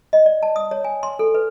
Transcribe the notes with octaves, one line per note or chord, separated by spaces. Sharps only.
D#5
D5
A5
D#6
C#5
G#5
C6
A4
B4